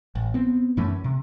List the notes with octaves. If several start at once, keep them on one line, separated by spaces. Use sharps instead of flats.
A1
B3 C4
F#2 E3 A3 C#4
C3